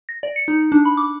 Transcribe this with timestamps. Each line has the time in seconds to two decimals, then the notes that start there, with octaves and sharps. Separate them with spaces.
0.09 A#6
0.23 D5
0.36 C#7
0.48 D#4
0.72 D4
0.85 B5
0.97 D6